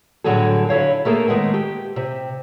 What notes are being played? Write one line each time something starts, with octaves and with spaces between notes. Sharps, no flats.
A2 D3 F#3 G3 G#4 A4
D3 E4 C#5 F5
A3 A#3 G#4 A4
D#3 G#3 A3 B3
G4
C3